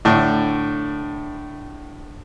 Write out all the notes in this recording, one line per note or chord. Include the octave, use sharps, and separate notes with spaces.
A2 D3 D4